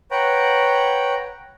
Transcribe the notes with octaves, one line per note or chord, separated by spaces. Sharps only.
B4 C#5 F#5 G5 A#5